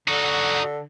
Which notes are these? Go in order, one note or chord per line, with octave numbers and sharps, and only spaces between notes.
D3 D#4 F#4